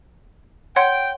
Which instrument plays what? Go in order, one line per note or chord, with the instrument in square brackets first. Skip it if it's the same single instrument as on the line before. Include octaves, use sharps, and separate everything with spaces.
[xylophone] C#5 F#5 C6 [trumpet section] G5